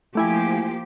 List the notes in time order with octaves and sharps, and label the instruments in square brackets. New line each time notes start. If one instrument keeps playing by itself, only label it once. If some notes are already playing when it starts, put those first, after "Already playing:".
[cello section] F3 A#3 G4 [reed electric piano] A3 E4 G#5